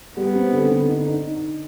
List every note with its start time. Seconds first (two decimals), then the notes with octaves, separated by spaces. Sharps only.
0.16 G3 B3
0.35 C4
0.53 D3
0.70 D3
0.88 D#4
1.06 D#4